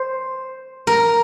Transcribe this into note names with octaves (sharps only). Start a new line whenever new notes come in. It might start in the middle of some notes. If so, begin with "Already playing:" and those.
Already playing: C5
A#4